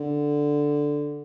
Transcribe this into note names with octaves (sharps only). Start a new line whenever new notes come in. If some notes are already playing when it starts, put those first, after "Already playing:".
Already playing: D3